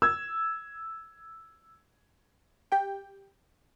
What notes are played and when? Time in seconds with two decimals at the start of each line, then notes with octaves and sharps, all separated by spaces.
0.02 E6 G#6
2.72 G4 G5